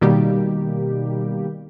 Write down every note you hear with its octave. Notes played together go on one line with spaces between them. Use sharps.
B2 D#3 G3 A#3 G4